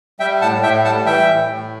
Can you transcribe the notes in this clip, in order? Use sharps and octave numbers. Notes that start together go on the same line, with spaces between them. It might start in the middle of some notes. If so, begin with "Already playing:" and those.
G3 E5 G5
A2 F#5 A5
A2 E5 G5
G3 F#5 A5
E3 E5 G5
A2
A2